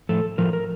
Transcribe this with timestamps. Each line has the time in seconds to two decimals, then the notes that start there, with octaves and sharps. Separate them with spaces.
0.09 A2 F3 A3 A4
0.38 A2 F3 A3 A#4
0.53 A#4